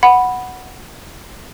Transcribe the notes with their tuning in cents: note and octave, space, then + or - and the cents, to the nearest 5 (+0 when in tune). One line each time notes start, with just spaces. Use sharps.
F#5 +0 B5 +0